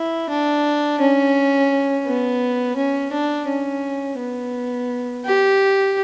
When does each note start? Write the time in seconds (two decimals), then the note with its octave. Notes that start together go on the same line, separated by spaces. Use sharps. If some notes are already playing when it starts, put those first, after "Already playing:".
Already playing: E4
0.29 D4
1.00 C#4
2.06 B3
2.76 C#4
3.12 D4
3.48 C#4
4.19 B3
5.25 G4